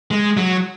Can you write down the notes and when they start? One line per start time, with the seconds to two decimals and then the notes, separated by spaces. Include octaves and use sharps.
0.11 G#3
0.37 F#3